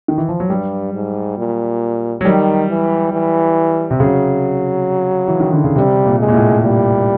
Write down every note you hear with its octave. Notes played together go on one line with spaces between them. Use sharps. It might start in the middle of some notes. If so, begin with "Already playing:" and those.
D#3
E3
F3
F#3
G2 G3
G#2
A#2
F#3
D#3 G3
E3
E3
C3
C#3 F#3
E3
D#3
D3
C#3
C3 G3
A#2
G#3
A#2
A2
A#2 G3